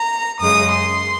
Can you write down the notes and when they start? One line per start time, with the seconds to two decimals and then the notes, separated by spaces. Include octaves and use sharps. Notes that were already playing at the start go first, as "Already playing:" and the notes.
Already playing: A#5
0.40 F#2 C#3 G#3 D#6
0.72 C6